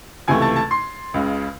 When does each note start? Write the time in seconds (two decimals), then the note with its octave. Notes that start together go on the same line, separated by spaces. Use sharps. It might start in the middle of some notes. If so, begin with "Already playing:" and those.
0.28 C#2 C3 E3 A3 G#5 G#6
0.42 A5 A6
0.56 A5 A6
0.71 C6 C7
1.14 C#2 C#3 G#3